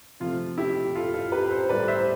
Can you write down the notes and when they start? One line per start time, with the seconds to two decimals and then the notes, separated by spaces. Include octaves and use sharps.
0.20 C3 F3 A3 F4
0.58 E4 G4
0.95 F4 A4
1.14 F4 A4
1.32 G4 B4
1.51 A4 C5
1.69 A2 G3 B4 D5
1.88 C5 E5